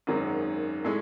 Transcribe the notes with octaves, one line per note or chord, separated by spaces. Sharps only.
G#1 F#2 D#3 G#3
A2 G#3